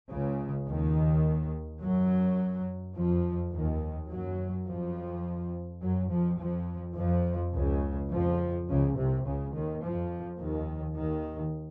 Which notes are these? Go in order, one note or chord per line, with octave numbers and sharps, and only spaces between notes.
C#2 C#3
D#2 D#3
F#2 F#3
F2 F3
D#2 D#3
F#2 F#3
F2 F3
F#2 F#3
F2 F3
F2 F3
F2 F3
C#2 C#3
F2 F3
C#2 C#3
C2 C3
C#2 C#3
D#2 D#3
F2 F3
D#2 D#3
D#2 D#3